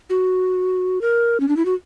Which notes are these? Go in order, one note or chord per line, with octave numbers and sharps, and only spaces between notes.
F#4
A#4
C#4
D4
E4
F#4